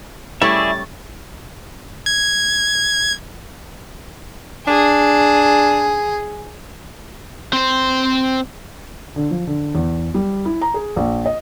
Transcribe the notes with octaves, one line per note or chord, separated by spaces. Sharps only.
G3 A3 C#4 E4 G#4 D5 E5 A6
G#6
D4 G#4
C4 C5
D3
F3
D3
E2
G3
E4
A#5
G#4
A#1
D#5